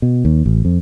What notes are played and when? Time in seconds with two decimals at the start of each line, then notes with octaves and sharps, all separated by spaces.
0.02 B2
0.25 D#2
0.46 A1
0.65 F2